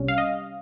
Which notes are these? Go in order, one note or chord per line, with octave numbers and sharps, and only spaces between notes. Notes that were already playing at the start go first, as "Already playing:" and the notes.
Already playing: C2 C3 G3 C#4
F5
D#5